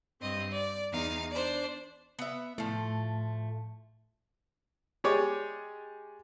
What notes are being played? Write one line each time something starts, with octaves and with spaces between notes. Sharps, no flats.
G2 C4 D#5 C6
D5
E2 D#4 F5
D4 C5 D5
B3 E5
A2 F3 A3
G#3 G4 G#4 C#5 D5